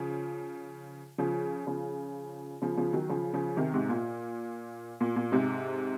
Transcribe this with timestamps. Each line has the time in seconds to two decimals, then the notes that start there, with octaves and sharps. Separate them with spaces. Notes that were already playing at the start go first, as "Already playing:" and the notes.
Already playing: C#3 F3
1.18 C#3 F3
1.67 C#3 F3
2.62 C#3 F3
2.77 C#3 F3
2.93 D#3 F#3
3.09 C#3 F3
3.33 C#3 F3
3.57 C3 D#3
3.74 G#2 C3
3.89 A#2
5.01 A#2
5.16 A#2
5.32 G#2 C3